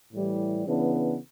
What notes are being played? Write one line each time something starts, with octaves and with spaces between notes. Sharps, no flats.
A2 E3 G3
C#3 E3 B3 D4